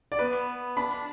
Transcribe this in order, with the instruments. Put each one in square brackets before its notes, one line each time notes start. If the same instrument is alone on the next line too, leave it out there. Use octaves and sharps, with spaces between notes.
[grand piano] D5
[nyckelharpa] B3 [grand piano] B4
[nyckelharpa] D4 [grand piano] B5